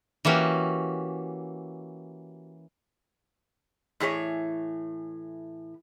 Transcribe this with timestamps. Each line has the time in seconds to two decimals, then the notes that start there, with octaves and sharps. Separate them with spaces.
0.25 E3 A#3 C#4 F#4 G4
4.00 A2 E3 G#4 C#5